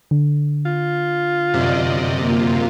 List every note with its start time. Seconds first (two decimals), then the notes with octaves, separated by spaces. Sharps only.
0.11 D3
0.66 F4
1.54 F#2 C3 D5 D#5
2.18 A#3 F4